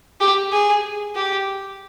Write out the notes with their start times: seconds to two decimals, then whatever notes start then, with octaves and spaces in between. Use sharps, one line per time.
0.21 G4
0.52 G#4
1.15 G4